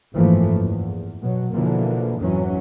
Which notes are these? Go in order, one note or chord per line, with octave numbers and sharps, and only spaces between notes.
G#1 F#2 E3 F3 A3 A#3
E2
B2 F#3
B2 D3 E3 F3 A#3
F2 G#2 E3 F#3 C#4